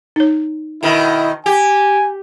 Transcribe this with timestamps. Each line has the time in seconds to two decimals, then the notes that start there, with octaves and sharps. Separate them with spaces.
0.16 D#4 C#5
0.83 B2 D#3 E4
1.46 G4 G#5